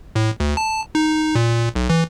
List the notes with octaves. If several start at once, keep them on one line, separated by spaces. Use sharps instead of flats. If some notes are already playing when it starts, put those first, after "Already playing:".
A2
D2
A5
D#4
A#2
B1
E3